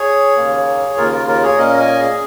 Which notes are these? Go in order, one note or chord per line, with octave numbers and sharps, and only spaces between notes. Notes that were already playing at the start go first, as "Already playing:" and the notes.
Already playing: G#4 C#5
D#2 C#3 A#3
D#2 C#3 A#3 F4 A#4
F4 A#4
F4 A#4
G#4 C#5
A#2 A#3 C#4 A#4 D#5
D#5 G#5
G#4